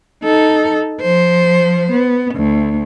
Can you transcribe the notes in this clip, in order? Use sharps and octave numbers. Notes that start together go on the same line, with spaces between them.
D#4 A4
F3 C5
B3
D2